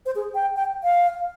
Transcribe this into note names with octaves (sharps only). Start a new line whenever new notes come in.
C5
G#4
G5
G5
F5